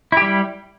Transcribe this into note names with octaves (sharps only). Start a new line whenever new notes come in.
G3 E4 G4